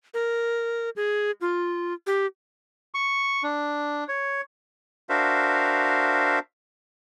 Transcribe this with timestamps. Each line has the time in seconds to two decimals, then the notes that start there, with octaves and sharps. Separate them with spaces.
0.14 A#4
0.96 G#4
1.41 F4
2.07 G4
2.94 C#6
3.43 D4
4.09 C#5
5.09 D4 F#4 A#4 C5 E5 F5